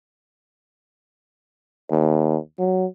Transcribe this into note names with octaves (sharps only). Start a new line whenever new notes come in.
D#2
F#3